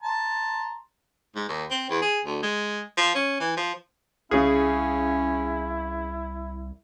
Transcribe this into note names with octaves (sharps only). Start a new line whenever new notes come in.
A5 A#5 C6
G#2
D#2
C4
E2
G#4
D2
G#3
F3
C#4
E3
F3
C2 C#3 C#4 E4 G#4